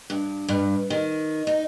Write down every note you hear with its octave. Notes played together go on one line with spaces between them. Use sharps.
G2
G2
D#3
D#4